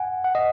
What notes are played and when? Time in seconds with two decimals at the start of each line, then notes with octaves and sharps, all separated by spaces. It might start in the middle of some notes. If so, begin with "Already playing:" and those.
Already playing: F#5 G#5
0.24 F#5
0.35 D#5